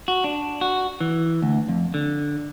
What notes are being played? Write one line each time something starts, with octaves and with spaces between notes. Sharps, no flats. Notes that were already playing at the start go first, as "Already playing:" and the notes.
F#4
D4
F#4
E3
D2
F2
D3